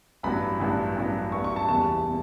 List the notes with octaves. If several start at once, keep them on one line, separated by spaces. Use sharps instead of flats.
A1 G2 F#3 B3 B5
A1 G2 F#3 B3
A1 G2 F#3 B3
A1 G2 F#3 B3 C#6
C#6
A5
F#1 E2 B2 G3 A5
B2